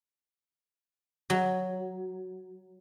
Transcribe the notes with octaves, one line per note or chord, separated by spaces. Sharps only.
F#3